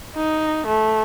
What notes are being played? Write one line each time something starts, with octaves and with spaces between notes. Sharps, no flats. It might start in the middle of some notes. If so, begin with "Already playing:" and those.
D#4
A3